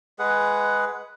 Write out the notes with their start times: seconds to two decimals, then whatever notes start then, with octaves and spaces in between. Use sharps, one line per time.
0.19 G#3 G#4 B4 F#5